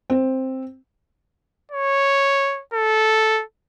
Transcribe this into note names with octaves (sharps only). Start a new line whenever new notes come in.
C4
C#5
A4